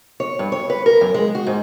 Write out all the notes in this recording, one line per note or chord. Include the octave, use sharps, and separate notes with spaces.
C#5
G2
C#5
B4
A#4
F#2
G#3
F#4
G#2